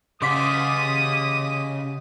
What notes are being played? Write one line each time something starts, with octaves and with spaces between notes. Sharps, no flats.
C#3 G4 D#5 F#5 C6 D6 D#6 B6